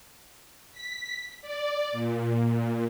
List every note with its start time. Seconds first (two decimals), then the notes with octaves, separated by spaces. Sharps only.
0.72 B6
1.42 D5
1.92 A#2